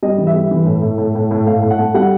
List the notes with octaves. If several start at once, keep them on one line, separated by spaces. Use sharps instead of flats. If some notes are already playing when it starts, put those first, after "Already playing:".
G3 D#5
E3
E5
G3
E3
A2
A2
A2
A2
A2
A2 F5
A2
F#5
A3
G3 F#5